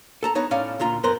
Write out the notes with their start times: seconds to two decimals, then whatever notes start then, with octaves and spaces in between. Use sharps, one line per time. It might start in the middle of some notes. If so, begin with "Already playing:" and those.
0.23 A4 A5 A#5
0.35 B3 D#4 C#5
0.51 A2 C#4 D5 F5
0.79 D2 A#2 F4 A#5
1.03 F#2 B3 A#4 C5 C6